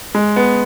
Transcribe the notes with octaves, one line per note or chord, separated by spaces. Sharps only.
G#3
B3